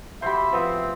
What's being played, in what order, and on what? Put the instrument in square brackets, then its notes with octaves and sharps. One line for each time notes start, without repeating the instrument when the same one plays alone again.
[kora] A3 F#4 G4 [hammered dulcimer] C5 B5 [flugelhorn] E5
[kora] F3 B3 [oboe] C4